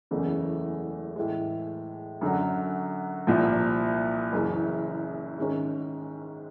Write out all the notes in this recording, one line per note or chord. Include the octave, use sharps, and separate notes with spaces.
F#1 E2 C#3 E3 A3
A2 E3 G#3
F#2 D3 F#3
C2 A#2 F3
F#1 F#2 C#3 E3
G#2 D#3 G#3 C#4